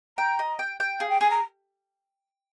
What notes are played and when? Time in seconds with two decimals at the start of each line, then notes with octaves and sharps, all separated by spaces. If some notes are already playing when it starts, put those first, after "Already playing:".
0.18 G5 A#5
0.39 D#5
0.59 G5
0.80 G5
1.00 G#4 F5
1.09 G5
1.21 G#4 G#5
1.31 A#5